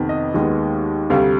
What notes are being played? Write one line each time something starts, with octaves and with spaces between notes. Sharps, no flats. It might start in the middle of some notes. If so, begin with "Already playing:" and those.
Already playing: F2 C3 D#3 B3
D#5
D#2 D#3 G#3 B3
D2 C3 G3 F5